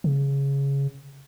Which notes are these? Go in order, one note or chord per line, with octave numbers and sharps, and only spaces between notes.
C#3